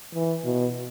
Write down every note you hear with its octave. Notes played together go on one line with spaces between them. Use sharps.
E3
B2